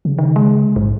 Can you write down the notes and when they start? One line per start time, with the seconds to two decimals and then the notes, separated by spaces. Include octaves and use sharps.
0.05 C#3
0.18 D#3
0.36 G#3
0.76 A1 G#2